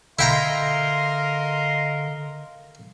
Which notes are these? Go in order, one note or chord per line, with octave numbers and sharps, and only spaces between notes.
D3 E4 A#4 D#5 F5 G5 A#5 C6